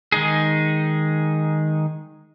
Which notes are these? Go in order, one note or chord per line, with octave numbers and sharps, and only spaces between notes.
D#3 G#3 D#4 G#4